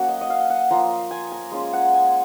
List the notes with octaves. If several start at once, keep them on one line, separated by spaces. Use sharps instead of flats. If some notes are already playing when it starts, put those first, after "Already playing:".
Already playing: F#3 A#3 C#4 F#4
D#5
D#5
F5
F#5
F3 A#3 F4 A#5
G#5
A#5
G#3 C#4 F4
F#5
G#5